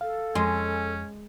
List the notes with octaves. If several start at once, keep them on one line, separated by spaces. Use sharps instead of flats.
A4 F5
F2 G#3 C#4